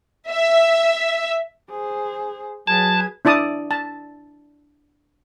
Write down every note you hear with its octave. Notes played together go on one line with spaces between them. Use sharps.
E5
G#4 C5
F#3 G#4 B4 A5 G#6
D4 E4 D5 A5 D#6
A5